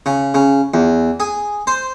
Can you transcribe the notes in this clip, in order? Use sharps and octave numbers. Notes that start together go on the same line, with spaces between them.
C#3
C#3
E2
G#4
C5